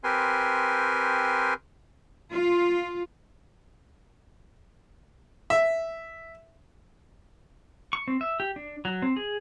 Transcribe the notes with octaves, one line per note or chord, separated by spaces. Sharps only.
C4 G4 A#4 B4 G#5 C6
F4
E5
C#6
C4
E5
G4
D4
F#3
C4
G#4